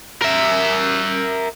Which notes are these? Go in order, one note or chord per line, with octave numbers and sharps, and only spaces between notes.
A#4 E5